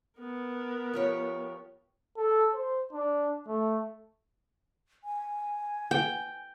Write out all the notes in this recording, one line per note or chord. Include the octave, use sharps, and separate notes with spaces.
B3 A#4
F3 G4 C#5
A4
C5
D4
A3
G#5
G5